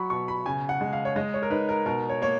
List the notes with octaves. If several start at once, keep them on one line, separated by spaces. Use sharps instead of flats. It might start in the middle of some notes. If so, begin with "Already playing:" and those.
Already playing: F#3 B5 C#6
B2 C#6
B5
C#3 G#5
F#5
G#3
F5
C#5
G#3 D#5
C#5
A#4
D#4 B4
A#4
B2 A#4
C#5
A#3 C#5